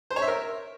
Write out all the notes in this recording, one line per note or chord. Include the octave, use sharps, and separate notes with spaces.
C5
C#5
E5
A#4